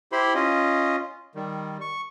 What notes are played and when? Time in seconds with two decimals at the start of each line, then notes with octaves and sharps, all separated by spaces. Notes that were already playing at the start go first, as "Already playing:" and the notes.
0.12 E4 G4 C5 B5 C6
0.35 C#4 F4 D#5
1.35 D#3 G3
1.81 C#6